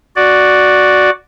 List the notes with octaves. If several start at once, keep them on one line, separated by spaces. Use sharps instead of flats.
F#4 D5